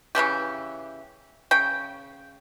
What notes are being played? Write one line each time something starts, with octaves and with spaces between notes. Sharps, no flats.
C#3 E3 F3 G4
C#3 G5